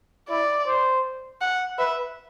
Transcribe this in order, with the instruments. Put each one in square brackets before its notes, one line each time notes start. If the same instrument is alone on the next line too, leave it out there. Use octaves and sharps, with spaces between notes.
[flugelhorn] E4 [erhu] D5
[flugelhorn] C5
[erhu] F#5
[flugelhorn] B4 [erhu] E5